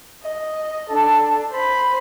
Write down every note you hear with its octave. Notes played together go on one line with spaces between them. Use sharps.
D#5
D4 A4
C5 B5